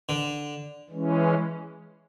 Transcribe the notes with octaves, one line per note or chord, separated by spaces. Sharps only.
D3
E3 G#3 C#4